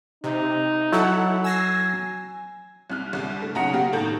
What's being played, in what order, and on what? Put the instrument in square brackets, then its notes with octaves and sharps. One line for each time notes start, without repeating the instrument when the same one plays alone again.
[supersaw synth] C3 [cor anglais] D#4
[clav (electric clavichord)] F#3 [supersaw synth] E4 A4 F#5
[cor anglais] G#5 [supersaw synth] E6 A#6 C7
[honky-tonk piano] C2 C3 F6 F#6
C2 D3
A3
B1 C#3 F#5 A#5 D#6 C#7
B3 F#4 G4 F5
A2 D#3 A4 A#5 G6 F#7